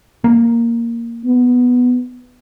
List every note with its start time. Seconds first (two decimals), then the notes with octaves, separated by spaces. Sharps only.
0.24 A#3
1.25 B3